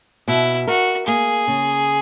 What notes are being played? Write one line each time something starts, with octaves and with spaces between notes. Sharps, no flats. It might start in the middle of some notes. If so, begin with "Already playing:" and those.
B2 E4
F#4 A#4
A#3 G#4
C#3